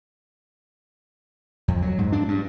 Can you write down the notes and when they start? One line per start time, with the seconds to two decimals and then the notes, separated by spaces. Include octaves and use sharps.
1.68 F2
1.82 F#3
1.98 G#2
2.12 D4
2.28 G2